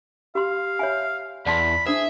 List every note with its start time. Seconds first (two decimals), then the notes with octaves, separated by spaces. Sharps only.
0.35 G4 F5 C6
0.79 C#5 E5 G#5
1.46 E2 D5 A5 B5 C6
1.87 D4 G#4 C5 E5